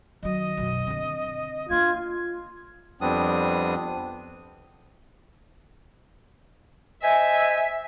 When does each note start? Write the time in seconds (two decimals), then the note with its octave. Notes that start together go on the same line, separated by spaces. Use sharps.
0.23 D#3 F#3 D#5
0.57 B1 F#2
0.87 D3 C4
1.69 A#3 D4 F4 G#6
3.01 F2 G3 B3 C4 D4 D#6
7.02 C5 D#5 E5 G#5